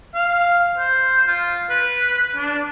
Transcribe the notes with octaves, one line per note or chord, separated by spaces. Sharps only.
F5
C5
F4
B4
D4